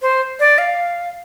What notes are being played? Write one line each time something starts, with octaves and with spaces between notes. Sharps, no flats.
C5
D5
F5